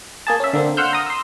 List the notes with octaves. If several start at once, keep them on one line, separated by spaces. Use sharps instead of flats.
A#3 G#4 A5
C#4 E5
D3 A#3 C4
F5 F#5 C6 E6 F6 G6
A#5 D#6
C6 E6